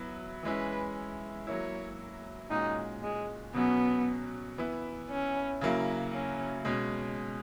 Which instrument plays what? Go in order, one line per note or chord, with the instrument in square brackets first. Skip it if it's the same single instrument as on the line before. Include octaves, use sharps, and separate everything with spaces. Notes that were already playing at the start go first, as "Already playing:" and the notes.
Already playing: [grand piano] F#3 B3 E4
[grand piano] E3 G#3 C#4 E4 [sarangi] B4
[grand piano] F#3 A#3 E4 [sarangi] C#5
[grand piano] A#2 G#3 C#4 F#4 [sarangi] D#4
[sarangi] G#3
[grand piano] B2 F#3 C#4 [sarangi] B3
[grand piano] E3 B3 E4
[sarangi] C#4
[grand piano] C#3 F#3 A#3 E4
[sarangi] C#4
[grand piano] B2 G#3 C#4